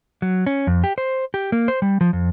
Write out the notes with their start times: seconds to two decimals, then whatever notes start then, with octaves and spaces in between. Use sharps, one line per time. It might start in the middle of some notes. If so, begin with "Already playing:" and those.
0.22 F#3
0.47 C#4
0.67 F2
0.84 G4
0.98 C5
1.34 G4
1.52 A#3
1.68 C5
1.82 G3
2.01 F3
2.13 F2